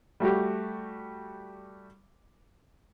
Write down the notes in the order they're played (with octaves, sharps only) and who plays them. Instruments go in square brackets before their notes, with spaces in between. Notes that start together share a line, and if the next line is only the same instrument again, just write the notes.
[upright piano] G3 A3 F#4 G4